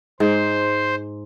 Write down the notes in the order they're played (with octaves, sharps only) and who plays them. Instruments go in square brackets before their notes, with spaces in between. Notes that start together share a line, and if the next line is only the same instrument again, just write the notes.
[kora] G#2 [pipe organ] C5